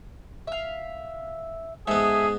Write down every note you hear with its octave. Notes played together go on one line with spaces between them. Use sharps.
E5 F5
G#2 B3 G#4 A4 E5